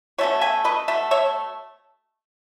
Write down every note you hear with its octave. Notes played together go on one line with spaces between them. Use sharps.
B2 A3 C#4 C#5 E5
E5 G#5
B4 D#5
B2 A3 E5
C#5 E5